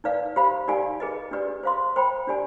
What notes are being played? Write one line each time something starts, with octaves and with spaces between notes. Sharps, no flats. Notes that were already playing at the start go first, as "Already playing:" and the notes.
D#4 B4 D5 F5
G4 C5 F5 B5
D#4 G4 D5 F5 G#5
G#4 B4 D#5
D4 G4 B4 D5
C5 F5 C6
C5 G5 B5
D4 G4 D5 G#5